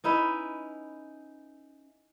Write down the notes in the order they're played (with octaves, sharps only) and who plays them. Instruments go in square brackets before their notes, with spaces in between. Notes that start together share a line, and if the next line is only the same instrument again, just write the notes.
[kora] C#4 D#4 E4 B4